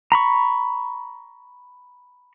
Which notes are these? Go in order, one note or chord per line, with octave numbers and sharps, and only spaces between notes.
A#5 B5 C#6